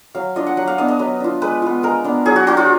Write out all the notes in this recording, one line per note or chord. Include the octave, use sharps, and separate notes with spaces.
F#3 F5
D4 F4 D#5
F#5
F#3 F#5
F5
B3 D4 D#5
D#5
F#3 B4
D4 F4
G#3 B4
B3 F4
G#3 A#4
B3 D4
F#3 G#4
F#4
D4 F4 F#4
F4